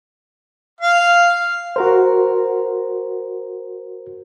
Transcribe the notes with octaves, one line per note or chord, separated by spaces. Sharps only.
F5
F#4 A#4 C5